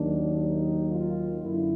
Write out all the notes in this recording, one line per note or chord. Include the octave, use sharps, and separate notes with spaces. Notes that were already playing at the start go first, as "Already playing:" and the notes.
Already playing: D#2 D#3 F#3 D4
D#4
F4
F#2 D3 E4